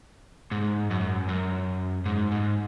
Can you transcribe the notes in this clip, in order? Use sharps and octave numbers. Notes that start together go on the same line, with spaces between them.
G#2
F#2
F#2
G#2
G#2